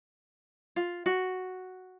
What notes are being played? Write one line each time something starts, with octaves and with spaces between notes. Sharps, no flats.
F4
F#4